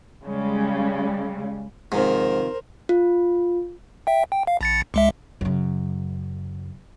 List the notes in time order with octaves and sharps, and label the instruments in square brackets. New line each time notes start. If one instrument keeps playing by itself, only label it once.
[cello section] C#3 G3 G#3
[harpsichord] G#2 [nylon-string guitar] C3 D#3 F3 [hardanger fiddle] A#4 C5
[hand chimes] F4
[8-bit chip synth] E5 G5
G5
F5
A#1 A6 C#7
C#2 G#3 E5
[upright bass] F#2 C#3